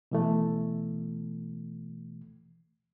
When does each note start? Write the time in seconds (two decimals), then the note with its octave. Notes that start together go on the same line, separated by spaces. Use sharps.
0.11 B2 E3 A3